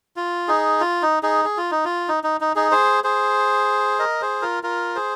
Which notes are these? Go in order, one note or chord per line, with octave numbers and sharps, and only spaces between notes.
F4
D#4 G#4
F4
D#4
D#4 G#4
G#4
F4
D#4
F4
D#4
D#4
D#4
D#4 G#4
G#4 C5
G#4 C5
A#4 D#5
G#4 C5
F4 A#4
F4 A#4
G#4 C5